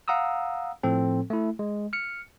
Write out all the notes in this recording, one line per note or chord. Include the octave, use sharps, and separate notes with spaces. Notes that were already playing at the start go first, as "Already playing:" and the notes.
F5 F#5 A#5 D#6 E6
A2 F3 C4 A4
A3 E4
G#3
F6 C#7